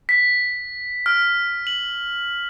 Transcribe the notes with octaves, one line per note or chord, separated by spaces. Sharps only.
B6
F6
F#7